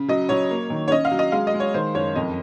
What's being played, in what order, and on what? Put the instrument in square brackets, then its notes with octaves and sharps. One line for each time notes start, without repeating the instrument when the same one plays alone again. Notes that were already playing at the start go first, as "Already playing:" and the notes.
Already playing: [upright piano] C#3
F#3 D#5
F#3 C#5
A#3
D#3
C#5
C#4 D#5
F5
F#3
D#5
G#3 F5
D#5
G#3
C#5
D#3 C5
F#1 C#5
F2 D#5